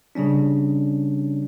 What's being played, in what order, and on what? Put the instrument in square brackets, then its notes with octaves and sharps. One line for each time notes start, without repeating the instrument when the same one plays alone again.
[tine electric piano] C#3 G3 C#4 D4